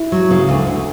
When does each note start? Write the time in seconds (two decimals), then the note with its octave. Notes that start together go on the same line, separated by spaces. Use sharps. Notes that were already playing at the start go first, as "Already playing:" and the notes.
Already playing: E4
0.12 F#3
0.31 C#3
0.49 D2
0.67 D2